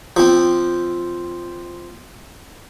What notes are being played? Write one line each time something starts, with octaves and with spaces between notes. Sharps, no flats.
F3 C4